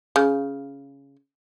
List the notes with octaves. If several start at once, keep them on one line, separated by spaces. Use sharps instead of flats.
C#3